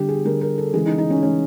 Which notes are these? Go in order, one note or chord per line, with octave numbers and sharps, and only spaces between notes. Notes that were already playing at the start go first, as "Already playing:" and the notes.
Already playing: D3 G3 G4
G#4
D3 G3 A#4
A#4
A4
C#3 E3 G#3 G#4
D#4
D#4
C#4
C#3 E3 G#3 C#4